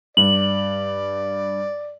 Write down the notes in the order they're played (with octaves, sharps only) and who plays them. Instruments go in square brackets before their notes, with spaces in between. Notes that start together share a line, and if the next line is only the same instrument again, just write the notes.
[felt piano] G2 [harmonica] D5 [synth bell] F#7